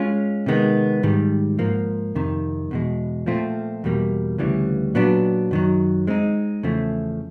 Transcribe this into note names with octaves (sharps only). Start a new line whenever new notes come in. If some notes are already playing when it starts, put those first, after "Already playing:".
Already playing: G#3 C#4 F4 G#4
C3 D#3 G#3 B3
G#2 D#3 G3
G#2 F3 A#3
F2 C3 D#3
E2 B2 G#3
A#2 F3 A3 C4 F4
E2 B2 G3 A#3
D2 C#3 E3 G3
A#2 F#3 B3 D4
F#2 D#3 F#3
G#3 C4 D#4
E2 C#3 F3 A3